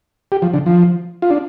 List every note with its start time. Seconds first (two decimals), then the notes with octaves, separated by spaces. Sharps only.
0.32 G4
0.42 F3
0.54 D3
0.66 F3
1.22 F4
1.30 D4